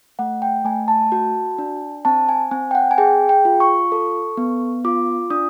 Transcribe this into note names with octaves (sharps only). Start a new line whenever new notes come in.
A3 F#5
G5
A3 G#5
A5
F#4
D4
C4 A5
G#5
C4 G#5
G5
F#5
G#5
G#4 G5
G5
F4
C#6
A4
B3
F4 D6
D4 D#6